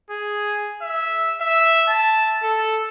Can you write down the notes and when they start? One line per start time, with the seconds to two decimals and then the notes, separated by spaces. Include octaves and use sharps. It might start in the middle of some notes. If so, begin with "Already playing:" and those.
0.10 G#4
0.82 E5
1.41 E5
1.88 A5
2.43 A4